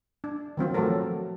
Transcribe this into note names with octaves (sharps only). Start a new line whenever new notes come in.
D4
D#3 F#3 C4 F4
F3 F#3 A3 F4 A4 A#4